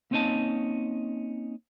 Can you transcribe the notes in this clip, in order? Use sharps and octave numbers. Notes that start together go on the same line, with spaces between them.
A#3 C4 C#4 D#4 D#5 A5